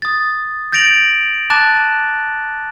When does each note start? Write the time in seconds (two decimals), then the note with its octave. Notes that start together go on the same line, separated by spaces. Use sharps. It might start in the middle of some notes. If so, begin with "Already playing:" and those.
0.02 D#6 A6
0.72 G6 A6 A#6 D7 F7 F#7
1.50 A5 A#5 D6 F#6 A6 E7